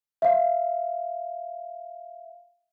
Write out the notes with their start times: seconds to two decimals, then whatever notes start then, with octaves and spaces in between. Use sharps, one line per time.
0.22 E5 F5